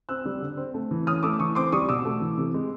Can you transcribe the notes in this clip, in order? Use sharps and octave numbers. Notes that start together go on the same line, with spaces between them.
C4 E6 F#6
G3
D3
C4
A3
E3
C#4 D#6 F6
A3 D6 E6
E3 C#6 D#6
C4 C6 D6
G3 C#6 D#6
B2 D6 E6
A3
E3
C3
G#3